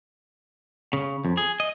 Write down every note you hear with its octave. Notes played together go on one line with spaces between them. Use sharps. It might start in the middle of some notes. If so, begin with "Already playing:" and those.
C#3
F2
G#4
D#5